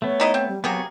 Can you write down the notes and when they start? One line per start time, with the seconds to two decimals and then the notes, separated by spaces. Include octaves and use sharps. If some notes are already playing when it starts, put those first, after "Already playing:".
0.02 A3 B3 C#5
0.20 D#4 E4 D#5
0.34 C4
0.48 G3
0.64 C3 F#3 A#3 B3 F#4 G#4